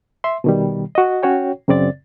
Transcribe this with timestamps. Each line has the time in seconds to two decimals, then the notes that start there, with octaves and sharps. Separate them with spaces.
0.24 E5 C6
0.44 B2 D#3 G3
0.95 F#4 D#5
1.23 C#4 F#4 C#5 G5
1.68 F#2 C#3 C4 D5 A6